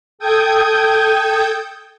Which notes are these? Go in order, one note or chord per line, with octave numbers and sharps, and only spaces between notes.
A4 G5 D#6 G6 G#6